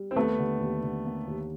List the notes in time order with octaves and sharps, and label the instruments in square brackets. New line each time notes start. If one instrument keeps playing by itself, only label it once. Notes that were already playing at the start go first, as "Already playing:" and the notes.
Already playing: [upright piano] G3
[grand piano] C4
[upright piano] D#2 [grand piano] A3 B3
[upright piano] D3
D#2
D3
A#3
D#2